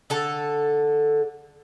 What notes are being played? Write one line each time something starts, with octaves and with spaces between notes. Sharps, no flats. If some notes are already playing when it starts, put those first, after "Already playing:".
D3 A4 A5